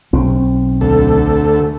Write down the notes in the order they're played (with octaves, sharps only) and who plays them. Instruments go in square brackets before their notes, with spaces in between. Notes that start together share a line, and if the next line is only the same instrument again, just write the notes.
[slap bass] B1 C4
[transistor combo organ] D2 A4